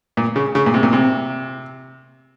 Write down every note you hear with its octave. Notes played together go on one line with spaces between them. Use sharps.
A#2
C#3
C#3
A#2
C3
A#2
C3